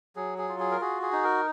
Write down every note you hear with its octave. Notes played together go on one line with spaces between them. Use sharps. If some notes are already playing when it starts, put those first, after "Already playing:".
F#3 G#4
G#4
F4
G#4
A#4
F#4 G#4
G#4
D#4
A#4